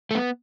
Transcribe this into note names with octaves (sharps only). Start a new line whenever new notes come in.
A3
B3